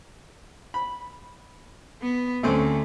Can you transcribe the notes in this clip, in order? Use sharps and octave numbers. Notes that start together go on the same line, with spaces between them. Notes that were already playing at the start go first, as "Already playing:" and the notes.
B5
B3
D2 A3 C4 C#4